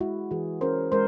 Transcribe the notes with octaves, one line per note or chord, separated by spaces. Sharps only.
G#3 E4 F#4
E3 F#4 G#4
C#4 A#4 C5
G#3 A#4 C5